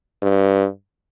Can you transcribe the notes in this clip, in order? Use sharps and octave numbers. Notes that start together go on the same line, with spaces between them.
G2